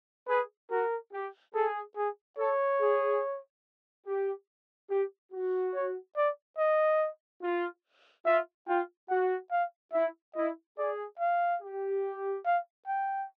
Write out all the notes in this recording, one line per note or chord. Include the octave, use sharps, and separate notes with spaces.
G#4 B4
F#4 A#4
G4
G#4 A4
G#4
A4 C#5
G#4
G4
G4
F#4
C#5
D5
D#5
F4
F4 E5
F4 G5
F#4 F#5
F5
E4 E5
E4 D#5
G#4 D5
F5
G4
F5
G5